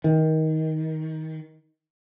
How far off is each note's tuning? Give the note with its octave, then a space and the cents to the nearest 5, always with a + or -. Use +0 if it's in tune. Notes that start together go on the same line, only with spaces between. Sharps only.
D#3 +20